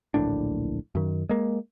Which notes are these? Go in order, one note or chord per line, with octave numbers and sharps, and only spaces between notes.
D1 A#1 A2 D4
F#2 D#3
G#3 A#3